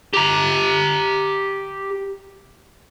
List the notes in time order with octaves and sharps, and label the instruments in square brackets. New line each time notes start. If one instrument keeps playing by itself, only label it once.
[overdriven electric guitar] G4 A#5